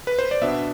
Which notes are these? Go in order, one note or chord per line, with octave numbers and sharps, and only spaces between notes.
B4
C5
D5
B2 B3 D4 E5